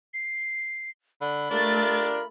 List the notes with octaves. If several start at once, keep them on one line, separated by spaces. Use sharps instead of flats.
C7
D3 B5
A3 D4 F4 G4 A#4 A6